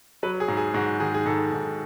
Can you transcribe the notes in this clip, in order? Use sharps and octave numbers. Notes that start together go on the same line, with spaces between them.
F#3 B4
G#4
G#2
G#4
G#2 F#4
D#3 G#4
G#4
G#2 A4
G#2